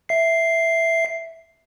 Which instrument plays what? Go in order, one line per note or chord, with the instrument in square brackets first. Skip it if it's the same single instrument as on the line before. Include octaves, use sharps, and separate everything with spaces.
[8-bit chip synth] E5 C7